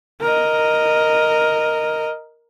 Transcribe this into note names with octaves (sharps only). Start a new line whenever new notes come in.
A#4 D#5